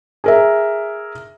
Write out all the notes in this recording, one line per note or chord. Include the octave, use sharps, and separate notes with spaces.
G#4 A#4 E5